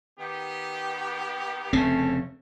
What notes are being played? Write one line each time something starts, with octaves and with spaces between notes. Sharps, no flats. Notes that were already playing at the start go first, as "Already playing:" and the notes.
D#3 B3 G4
F1 C#3 A3 C4 C#4